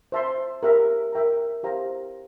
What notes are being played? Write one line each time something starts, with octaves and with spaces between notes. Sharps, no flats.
C5 E5 A5 C6
G4 A#4 E5 A#5
A#4 E5 G5 A#5
E4 G4 C5 F5 A#5